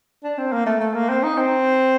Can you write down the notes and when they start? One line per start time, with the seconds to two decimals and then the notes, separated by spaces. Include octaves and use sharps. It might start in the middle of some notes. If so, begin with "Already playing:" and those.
0.24 D4
0.38 C4
0.53 A#3
0.66 A3
0.80 A3
0.94 A#3
1.09 C4
1.23 D#4
1.37 C4